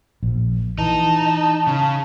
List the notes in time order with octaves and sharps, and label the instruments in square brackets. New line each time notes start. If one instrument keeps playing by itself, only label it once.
[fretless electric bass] A#1
[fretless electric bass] E3 [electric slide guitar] D#4 [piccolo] A5
[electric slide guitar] C#3